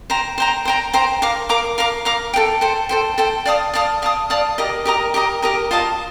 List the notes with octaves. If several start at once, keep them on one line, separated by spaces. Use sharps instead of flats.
C5 G5 A#5
C5 G5 A#5
C5 G5 A#5
C5 G5 A#5
A#4 F5 A#5 D6
A#4 F5 A#5 D6
A#4 F5 A#5 D6
A#4 F5 A#5 D6
A4 C5 G5
A4 C5 G5
A4 C5 G5
A4 C5 G5
D5 F5 A5 D#6
D5 F5 A5 D#6
D5 F5 A5 D#6
D5 F5 A5 D#6
G4 A#4 D#5 A#5
G4 A#4 D#5 A#5
G4 A#4 D#5 A#5
G4 A#4 D#5 A#5
F4 C5 D#5 A5